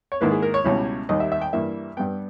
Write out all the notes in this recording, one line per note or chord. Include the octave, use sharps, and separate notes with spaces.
C#5
G#2 D#3 A#3 E4 B4
G#4
A#4
C#5
C#2 B2 G3 C#4 E4
D#2 D#3 G3 D#5
E5
E5
G5
G2 E3 A#3 E5
G2 G3 B3 G5